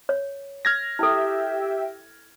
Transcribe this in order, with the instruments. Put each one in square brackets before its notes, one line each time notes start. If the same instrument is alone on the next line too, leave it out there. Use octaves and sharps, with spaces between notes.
[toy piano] C#5
[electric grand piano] F6 G#6 A#6
[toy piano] E4 A4 [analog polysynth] G4 E5 G5